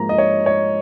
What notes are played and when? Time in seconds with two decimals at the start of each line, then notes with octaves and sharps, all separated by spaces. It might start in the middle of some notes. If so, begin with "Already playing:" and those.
Already playing: G#2 F3 A#3 A#5
0.09 D#5
0.18 C#5
0.46 C#5